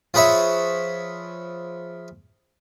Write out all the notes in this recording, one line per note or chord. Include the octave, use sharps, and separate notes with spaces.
F3 G#4 B4 C#5 E5